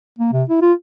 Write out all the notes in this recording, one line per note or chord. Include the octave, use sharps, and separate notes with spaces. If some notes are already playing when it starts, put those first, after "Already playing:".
A#3
C3
E4
F4